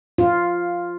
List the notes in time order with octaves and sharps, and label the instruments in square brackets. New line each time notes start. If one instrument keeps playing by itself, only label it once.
[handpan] F4